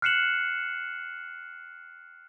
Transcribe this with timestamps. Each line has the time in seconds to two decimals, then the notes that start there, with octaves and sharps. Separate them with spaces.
0.02 F6 F#6 C7 C#7 E7 F#7